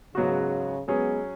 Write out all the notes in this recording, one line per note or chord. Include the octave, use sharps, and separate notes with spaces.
G#2 C#3 F#3 B3 F#4
F#3 G#3 B3 C#4 G#4